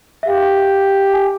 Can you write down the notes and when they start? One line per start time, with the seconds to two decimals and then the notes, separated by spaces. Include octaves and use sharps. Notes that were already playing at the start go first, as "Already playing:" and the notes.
0.23 E5
0.27 G4 F5
1.14 G#5